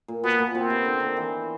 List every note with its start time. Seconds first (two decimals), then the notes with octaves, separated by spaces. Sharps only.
0.08 A#2
0.24 B2 B3
0.39 A#2
0.54 B2 C4
0.70 C3
0.85 D3
1.00 D#3
1.17 E3